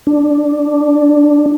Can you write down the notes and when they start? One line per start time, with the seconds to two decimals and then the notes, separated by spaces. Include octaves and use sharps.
0.07 D4